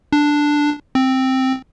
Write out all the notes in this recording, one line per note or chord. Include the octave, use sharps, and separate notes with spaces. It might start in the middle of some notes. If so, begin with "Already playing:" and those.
D4
C4